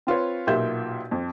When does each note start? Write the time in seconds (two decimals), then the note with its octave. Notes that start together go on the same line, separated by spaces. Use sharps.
0.07 C4 F4 B4 C#5
0.47 B1 A#2 F4 G4 E5 G6
1.11 F2